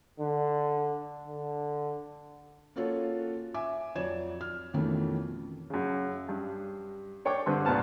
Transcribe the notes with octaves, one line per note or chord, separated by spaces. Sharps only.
D3
D3
A#3 C#4 F4 F#4 A4 C#5
E5 G#5 D6
F2 F#3 C#5 D5 G#6 E7
F6
F2 B2 D#3 E3 A3 C#4
F#2 C#3
G2
D4 C#5 G5 C#6 D6
G2 D3 C4 B4 C6
C2 A#2 B3 C5 A5 F6